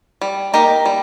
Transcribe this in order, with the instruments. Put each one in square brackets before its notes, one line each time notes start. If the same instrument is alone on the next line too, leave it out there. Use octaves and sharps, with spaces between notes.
[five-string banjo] G3
A#3 D#4 G4 A#4
G3